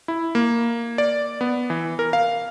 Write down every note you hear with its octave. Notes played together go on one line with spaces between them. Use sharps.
E4
A#3
D5
B3
E3
A#4
F5